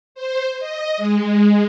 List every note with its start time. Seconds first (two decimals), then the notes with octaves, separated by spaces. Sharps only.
0.15 C5
0.59 D#5
0.97 G#3